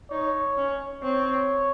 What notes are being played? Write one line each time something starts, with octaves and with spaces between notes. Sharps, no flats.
D#4 C#5
C#4
C4 C#5